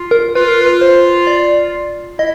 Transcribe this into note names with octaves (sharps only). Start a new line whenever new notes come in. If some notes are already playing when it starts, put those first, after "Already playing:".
Already playing: F4
A#4
F4 B4
A#4
B4
C5
D5
E4 D#5